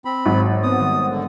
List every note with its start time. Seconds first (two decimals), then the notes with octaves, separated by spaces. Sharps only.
0.05 C4 B5
0.26 G#1 F#3
0.63 B3 C4 D#6
0.80 D#3 G3
1.10 D3